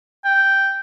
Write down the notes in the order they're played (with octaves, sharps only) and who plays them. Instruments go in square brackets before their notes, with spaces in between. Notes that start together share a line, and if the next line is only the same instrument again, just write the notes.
[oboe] G5